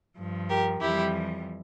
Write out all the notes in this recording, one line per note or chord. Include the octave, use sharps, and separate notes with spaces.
G2 F3
G4 A#4
F2 E3 G3 E4 G4